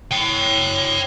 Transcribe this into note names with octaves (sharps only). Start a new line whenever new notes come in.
C#5 G5